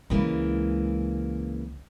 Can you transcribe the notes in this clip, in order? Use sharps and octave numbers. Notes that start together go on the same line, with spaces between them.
C#2 C#3 E3 G#3 A#3